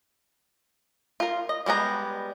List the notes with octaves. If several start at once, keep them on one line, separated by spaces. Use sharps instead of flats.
F4 A#4
D#5
G3 G#3 B3 A#5